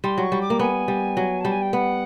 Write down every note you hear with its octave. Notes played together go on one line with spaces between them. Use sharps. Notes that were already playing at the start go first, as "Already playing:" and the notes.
G3 C6
F#3
C#6
G3
D6
A#3
B3 G#5
G3
F#3
G3 A5
G#5
G5
B3 F#5